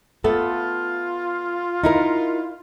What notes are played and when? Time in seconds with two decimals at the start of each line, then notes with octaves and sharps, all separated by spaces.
0.24 A3 B3 F4 A4
1.84 D#4 E4 A#4